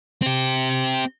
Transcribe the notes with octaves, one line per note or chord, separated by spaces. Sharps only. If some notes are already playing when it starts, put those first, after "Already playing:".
C4 G4